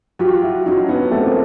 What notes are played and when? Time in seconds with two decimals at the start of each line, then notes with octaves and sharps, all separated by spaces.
0.19 F#3 F4 G4
0.43 E4 F#4
0.66 F#3 C#4 D#4
0.84 D4
0.89 B3 C#4
1.11 A3 C4
1.20 B3
1.26 A#3 C4